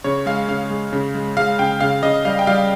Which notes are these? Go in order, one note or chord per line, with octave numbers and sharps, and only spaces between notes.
C#3 C#5
G#3 F5
C#3 F5
G#3
C#3
G#3
G#3 F5
C#3 G5
C#3 F5
C#3 D#5
G3 F5
G5
G3 F5